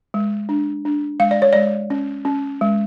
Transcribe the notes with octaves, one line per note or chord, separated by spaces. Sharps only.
G#3
D4
D4
G#3 F5
D5
C#5
G#3 D5
C#4
C#4
G#3